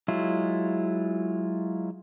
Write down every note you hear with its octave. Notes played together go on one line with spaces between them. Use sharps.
F#3 G#3 E4 F4